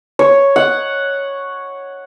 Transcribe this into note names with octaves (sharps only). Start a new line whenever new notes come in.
C#5
F#5